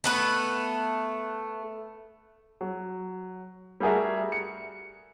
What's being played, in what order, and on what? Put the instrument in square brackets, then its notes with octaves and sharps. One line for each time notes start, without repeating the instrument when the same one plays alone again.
[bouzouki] A3 B3 B4
[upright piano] F#3
G3 A3 F#4 G#4 A#4 E5
C#7